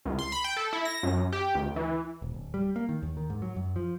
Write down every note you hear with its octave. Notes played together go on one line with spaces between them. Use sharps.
C#2
C6
B5
G5
A4
E4
A#6
F#2
G4
D2
E3
D#1
D1
G3
A#3
D#3
D#2
D#3
G#2
F#3
F#2
F3